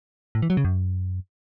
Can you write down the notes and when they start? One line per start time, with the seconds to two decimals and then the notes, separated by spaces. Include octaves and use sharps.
0.35 A2
0.42 E3
0.50 F#3
0.57 C#3
0.65 F#2